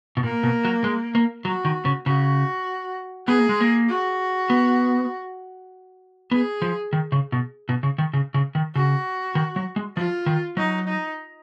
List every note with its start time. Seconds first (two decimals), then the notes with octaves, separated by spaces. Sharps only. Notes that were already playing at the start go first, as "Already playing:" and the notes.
0.17 B2
0.23 A#2 A#3
0.43 B2
0.65 F#3
0.84 G#3
1.15 A#3
1.45 F#3 F#4
1.65 D#3
1.85 C#3
2.06 C#3 F#4
3.27 B3 G#4
3.39 A#3
3.49 G#3
3.60 A#3
3.89 F#4
4.50 B3
6.31 B3 G#4
6.62 F3
6.93 D#3
7.12 C#3
7.32 B2
7.69 B2
7.83 C#3
7.98 D#3
8.13 C#3
8.34 C#3
8.55 D#3
8.75 C#3 F#4
9.35 D#3
9.56 F#3
9.76 G#3
9.97 F3 F4
10.26 D#3
10.57 F#3 D#4
10.88 D#4